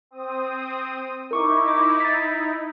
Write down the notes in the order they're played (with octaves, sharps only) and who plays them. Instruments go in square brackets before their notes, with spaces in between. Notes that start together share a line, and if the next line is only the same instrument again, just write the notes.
[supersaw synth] C4 D#6
[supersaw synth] D#4 E4 [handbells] A#4 C#6 D6
[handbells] D6
A6 B6